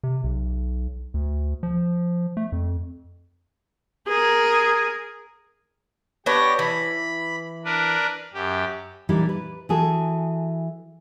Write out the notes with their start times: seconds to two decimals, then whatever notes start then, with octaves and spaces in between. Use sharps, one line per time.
0.03 C3
0.24 B1
1.14 D2
1.63 F3
2.37 A3
2.52 F2
4.08 G#4 A#4
6.26 B3 D4 G4 C#5 A#6
6.59 E3 B5
7.65 D4 A#4 B4
8.34 F#2 G4
9.09 A#2 E3 G3 D4 D#4
9.29 B4
9.69 E3 F#4 G#4 A4